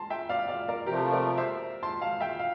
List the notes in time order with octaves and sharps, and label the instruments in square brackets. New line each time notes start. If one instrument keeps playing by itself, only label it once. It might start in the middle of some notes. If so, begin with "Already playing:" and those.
Already playing: [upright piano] A5 A#5 C6
E5 G5
D5 F5
D5 F5
A#4 D5
[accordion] C3 F3 A3 [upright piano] G4 A#4
[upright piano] A#4 D5
C5 E5
A5 C6
F5 A5
E5 G5
F5